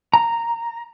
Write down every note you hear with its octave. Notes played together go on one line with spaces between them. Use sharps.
A#5